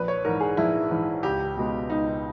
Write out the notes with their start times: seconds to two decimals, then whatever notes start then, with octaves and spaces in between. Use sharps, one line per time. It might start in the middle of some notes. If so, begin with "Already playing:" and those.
Already playing: A#1 B4
0.08 C#5
0.25 G#2 E3 A#4
0.40 G#4
0.57 A#1 E4
0.90 G#2 E3
1.23 C#2 G4
1.56 B2 G#3 B3
1.89 C#2 D#4